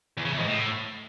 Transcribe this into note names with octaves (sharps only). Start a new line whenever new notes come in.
E2
C#3
E2
G#2
A2